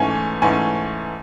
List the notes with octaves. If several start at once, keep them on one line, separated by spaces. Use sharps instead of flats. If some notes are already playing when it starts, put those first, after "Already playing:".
Already playing: G#2 E3 A3 C#4 G#5
G#2 E3 A3 C#4 G#5